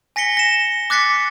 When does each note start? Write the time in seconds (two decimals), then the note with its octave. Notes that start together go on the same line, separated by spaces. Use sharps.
0.16 G#5 A#6 B6 C#7 G7
0.37 A#6 E7
0.90 D6 F#6 A6 B6 C#7